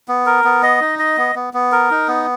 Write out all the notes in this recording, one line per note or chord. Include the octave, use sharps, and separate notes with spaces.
B3
A#4
B3
D#5
D#4
D#5
B3
B3
B3
A#4
D#4
B3